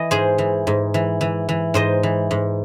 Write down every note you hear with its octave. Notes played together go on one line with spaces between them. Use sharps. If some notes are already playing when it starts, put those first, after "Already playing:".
Already playing: E3 D#5
G#2 G#4 C5
E3
G#2
E3
E3
E3
G#2 C5 D#5
E3
G#2